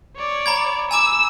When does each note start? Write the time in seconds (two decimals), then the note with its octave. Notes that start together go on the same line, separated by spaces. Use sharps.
0.17 C#5 D5
0.46 A#5 B5 G#6
0.91 G#5 A#5 D6 E6